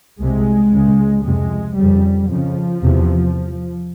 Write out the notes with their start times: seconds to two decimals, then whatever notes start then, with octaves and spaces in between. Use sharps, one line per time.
0.21 C2 C3 G#3
0.73 C#2 C#3
1.25 F2 C3 G#3
1.77 F2 C#3 G3
2.30 F2 C#3 F3
2.82 E2 C3